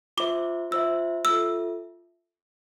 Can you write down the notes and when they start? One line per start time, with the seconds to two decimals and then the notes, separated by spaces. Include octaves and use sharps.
0.17 F4 C5 E5 D6
0.71 F4 C5 E5 E6
1.25 F4 A4 E5 E6